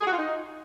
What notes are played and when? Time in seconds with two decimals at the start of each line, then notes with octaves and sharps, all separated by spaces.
0.01 G#4
0.07 F#4
0.13 F4
0.18 D#4